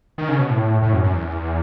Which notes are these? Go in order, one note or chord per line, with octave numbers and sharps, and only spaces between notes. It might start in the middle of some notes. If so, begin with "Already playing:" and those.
D#3
C#3
B2
A2
A2
F#2
F#2
E2